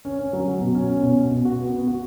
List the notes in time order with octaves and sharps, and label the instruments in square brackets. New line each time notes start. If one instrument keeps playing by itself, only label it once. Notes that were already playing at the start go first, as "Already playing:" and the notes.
[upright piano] C#4
C#4
F#3
F#3
B2
C#4
C#4
B2
F#4
B2
F#4
B3
B3
F#4